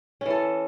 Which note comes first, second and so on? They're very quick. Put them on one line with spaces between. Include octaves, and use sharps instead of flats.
C#4 E3 A4